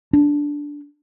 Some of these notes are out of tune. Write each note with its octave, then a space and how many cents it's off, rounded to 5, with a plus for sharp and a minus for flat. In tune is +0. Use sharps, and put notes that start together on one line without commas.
D4 -10